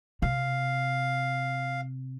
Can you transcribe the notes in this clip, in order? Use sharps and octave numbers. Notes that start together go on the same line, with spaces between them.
C3 F5